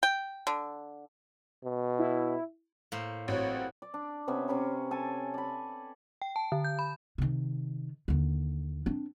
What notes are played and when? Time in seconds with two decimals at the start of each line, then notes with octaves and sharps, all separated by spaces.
0.03 G5
0.47 D3
1.64 B2
1.99 E4
2.92 A2 A#3 C5
3.28 A1 F#3 C4 C#5 F#5
3.82 D5
3.94 D4
4.28 C3 B3 C#4 E5
4.48 C3 C#4 B5 D6
4.91 A4 G#5 A5
5.34 D5 B5
6.22 G5
6.36 A5
6.52 D3
6.64 G6
6.79 B5
7.18 C3 D#3
8.08 D#2 D3
8.86 C4 D4